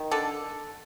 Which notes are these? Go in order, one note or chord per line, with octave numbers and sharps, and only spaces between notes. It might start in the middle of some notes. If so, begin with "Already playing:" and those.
Already playing: D#3
D3 A4